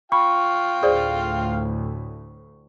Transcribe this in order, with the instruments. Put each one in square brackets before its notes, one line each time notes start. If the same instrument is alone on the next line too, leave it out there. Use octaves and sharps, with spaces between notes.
[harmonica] F4 F5 G5 [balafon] B5 [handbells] C#6
[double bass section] D2 A2 [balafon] G#4 C5 D5